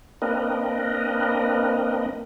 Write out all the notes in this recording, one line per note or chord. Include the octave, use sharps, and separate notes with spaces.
A#3 C4 D4 A#4 B4 D#5